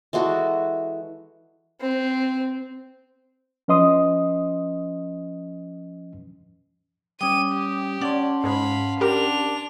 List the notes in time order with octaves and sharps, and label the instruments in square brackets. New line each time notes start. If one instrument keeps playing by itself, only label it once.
[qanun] E3 G#3 F#4 A4
[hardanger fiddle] C4
[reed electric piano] F3 C#4 B4 D#5 C6 D#6
[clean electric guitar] G3 C#4 [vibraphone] G5 D6 D#6 [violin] D#7
[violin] G4
[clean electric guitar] C#4 C#5 [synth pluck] D5 [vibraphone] F#5 A5 C6
[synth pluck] G#2 G#3 [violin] F5 B5
[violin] D4 F7 [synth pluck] G4 A#4